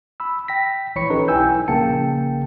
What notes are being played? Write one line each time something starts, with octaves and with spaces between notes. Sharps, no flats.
B5 E6
G5 A#6 B6
A#1 E3 C#5 B5 C#6 C#7
C#4 D#4 G4 A4 B4
B1 E4 G5 G#5 E6 G6
A#1 C#3 A#3 G5 A5 C#7